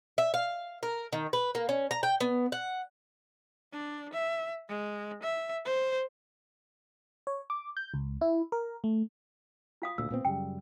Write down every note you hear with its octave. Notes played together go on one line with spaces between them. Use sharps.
E5
F5
A#4
D#3
B4
A#3
C#4
A#5
G5
B3
F#5
D4
E5
G#3
E5
C5
C#5
D6
G6
C#2
E4
A#4
A3
F4 F5 D#6
D2 A#2 E6
A#2 B3 C4
F#2 C#3 G3 G5